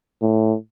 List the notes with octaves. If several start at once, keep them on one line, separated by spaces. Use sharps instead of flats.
A2